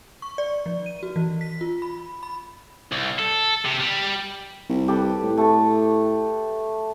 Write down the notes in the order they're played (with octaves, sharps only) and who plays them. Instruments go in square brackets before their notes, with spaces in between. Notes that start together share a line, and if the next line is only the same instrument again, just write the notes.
[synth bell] C#6
D5
F3
D#7
F#4
E3
B6
F4
B5
B5
[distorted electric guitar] C2
A4
C3
G3
[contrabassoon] C2
[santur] G4 A4 B4
[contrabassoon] A2
[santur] A3 G4 A4